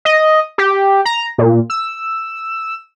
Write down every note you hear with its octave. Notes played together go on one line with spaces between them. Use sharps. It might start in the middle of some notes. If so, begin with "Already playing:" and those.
D#5
G4
A#5
A#2
E6